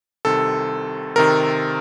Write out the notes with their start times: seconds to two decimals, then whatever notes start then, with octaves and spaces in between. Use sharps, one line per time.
0.25 C2 C3 D#3 A4
1.16 C3 D#3 A#4